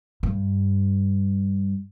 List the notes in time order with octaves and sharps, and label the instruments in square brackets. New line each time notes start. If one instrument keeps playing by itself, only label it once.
[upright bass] G2